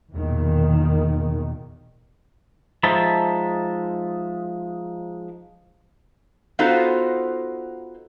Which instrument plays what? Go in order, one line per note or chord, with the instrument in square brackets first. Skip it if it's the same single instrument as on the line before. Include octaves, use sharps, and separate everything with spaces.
[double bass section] B1 E2 A#2 D#3
[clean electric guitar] F3 G#3 D#4 E5 A5
[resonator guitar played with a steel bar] B3 D#4 F4 F#4 A4 C5